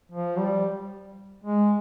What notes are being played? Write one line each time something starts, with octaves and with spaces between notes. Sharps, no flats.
F3
G3
G#3